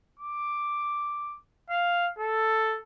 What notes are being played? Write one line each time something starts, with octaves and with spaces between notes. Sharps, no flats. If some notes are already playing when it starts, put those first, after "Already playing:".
D6
F5
A4